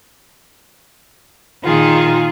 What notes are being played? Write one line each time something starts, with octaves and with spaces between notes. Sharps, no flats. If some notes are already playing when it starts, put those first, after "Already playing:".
A#2 D#3 F4 G#4